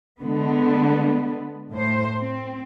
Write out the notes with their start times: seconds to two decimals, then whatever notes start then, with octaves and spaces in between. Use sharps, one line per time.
0.18 D3 G#3 B3
1.72 A2 C5
2.18 C4